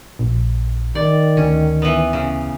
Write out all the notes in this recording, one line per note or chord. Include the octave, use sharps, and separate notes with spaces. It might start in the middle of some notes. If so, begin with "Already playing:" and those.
A#1
D#3 D5
D2 C#4
E3 B3
C#3